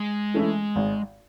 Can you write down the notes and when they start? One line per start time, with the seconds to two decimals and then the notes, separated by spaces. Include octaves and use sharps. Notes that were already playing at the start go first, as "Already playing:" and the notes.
Already playing: G#3
0.34 E3 A3 C#4 E4
0.76 G#1